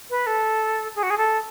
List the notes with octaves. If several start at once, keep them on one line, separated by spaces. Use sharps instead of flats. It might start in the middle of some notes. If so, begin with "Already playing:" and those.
B4
A4
G#4
F#4
G#4
A4